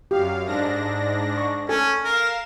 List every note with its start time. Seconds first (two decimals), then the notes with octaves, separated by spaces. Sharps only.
0.11 F#2 G4 F5
0.46 G#2 D4 A#6
1.38 C#6
1.69 C#4 A4 G#5
2.05 A#4 F5 E7